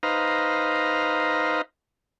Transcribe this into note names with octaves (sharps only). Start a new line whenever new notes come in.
D#4 B4 C5 F5 A#5